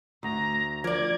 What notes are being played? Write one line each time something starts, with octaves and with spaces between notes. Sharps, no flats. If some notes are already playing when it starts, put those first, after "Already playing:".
D2 A#5
F3 A#4 D5 D6 G#6